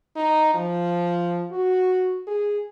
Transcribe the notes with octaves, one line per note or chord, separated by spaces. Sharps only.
D#4
F3
F#4
G#4